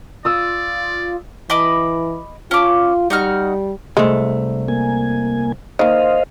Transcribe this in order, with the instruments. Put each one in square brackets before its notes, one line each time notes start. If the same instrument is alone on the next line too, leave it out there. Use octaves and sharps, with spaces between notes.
[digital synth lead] F4 [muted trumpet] D5 [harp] D#6 E6
[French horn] E3 [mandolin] D#5 B5 D6
[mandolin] C#4 D6 [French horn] F4
[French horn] G3 [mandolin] D#4 F#4 F6
[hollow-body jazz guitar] C2 A3 [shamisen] G#3
[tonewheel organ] A#3 G#5
[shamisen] D#3 A#3 [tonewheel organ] C5 D#5 F5